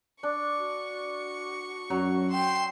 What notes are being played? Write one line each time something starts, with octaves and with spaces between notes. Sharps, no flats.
D4 C#6
F#4
F#2 F#3
G5 C6 E7